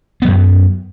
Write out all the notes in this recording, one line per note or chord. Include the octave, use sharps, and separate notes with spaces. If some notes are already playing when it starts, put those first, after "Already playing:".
F#2 F#3 B3